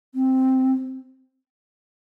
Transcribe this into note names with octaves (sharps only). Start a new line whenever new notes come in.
C4